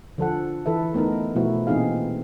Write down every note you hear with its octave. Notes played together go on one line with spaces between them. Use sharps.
D3 F3 A4 F#5
E3 A4 B4 E5
A3 B3 D#4 A#4
B2 F3 A3 B3 E4 F#4
A#2 E3 C4 D#4 G#4 F5